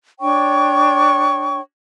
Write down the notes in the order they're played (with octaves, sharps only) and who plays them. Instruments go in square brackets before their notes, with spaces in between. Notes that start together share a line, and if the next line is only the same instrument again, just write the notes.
[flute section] D4 C#5 G5 C#6